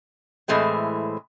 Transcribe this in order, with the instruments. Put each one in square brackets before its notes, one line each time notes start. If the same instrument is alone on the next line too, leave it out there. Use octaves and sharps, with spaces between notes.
[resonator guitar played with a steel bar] A2 E3 G#3 A3 C4